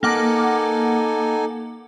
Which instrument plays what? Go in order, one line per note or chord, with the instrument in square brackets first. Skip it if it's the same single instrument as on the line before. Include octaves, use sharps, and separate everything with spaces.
[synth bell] A#3 F#5 D6 [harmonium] D#4 A4 G#5